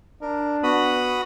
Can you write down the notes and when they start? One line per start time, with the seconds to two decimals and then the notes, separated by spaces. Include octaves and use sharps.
0.22 D4 A#4
0.63 B3 F#4 B5 D#6